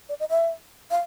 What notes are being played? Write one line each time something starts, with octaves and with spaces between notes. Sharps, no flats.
D5
D#5
E5
F5